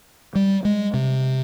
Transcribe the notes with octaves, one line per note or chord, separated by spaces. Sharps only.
G3
G#3
C3